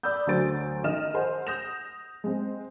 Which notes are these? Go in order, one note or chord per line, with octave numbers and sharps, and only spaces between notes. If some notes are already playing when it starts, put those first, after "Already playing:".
D5 B5 D#6 E6 G6
D2 F#3 F#4 C5 A6 D7
D#3 D#5 F6 E7
G#4 C5 F#5
D#6 G6 A#6 E7 F7
G#3 C4